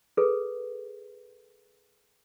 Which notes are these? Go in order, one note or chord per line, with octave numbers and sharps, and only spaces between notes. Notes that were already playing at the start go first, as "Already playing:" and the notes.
G#4 A4 B4